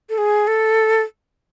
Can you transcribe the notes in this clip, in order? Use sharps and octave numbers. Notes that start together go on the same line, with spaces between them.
A4
G#4
A4